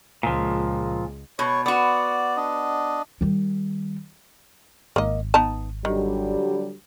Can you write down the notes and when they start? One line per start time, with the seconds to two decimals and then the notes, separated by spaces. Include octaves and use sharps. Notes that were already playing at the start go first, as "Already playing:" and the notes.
0.23 C#2 A#2 F3 G#3
1.39 B2 C#5
1.66 B3 F#4 D5
2.37 D4 D#5
3.21 D#3 G3
4.96 G#1 A#3 D#5
5.34 B3 D#4 A5
5.85 D3 D#3 F#3 G3